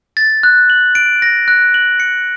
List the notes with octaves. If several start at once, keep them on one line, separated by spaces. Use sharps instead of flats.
A6
F#6
F#7
D7
A#6
F#6
F#7
C#7